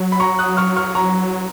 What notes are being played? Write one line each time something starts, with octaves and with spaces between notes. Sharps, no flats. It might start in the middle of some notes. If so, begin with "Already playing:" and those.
Already playing: F#3
B5
A#5 C#6
D#6 F#6
C#6 F6
C#6 F6
A#5 C#6